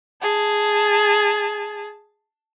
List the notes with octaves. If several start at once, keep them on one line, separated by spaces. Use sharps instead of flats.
G#4 A5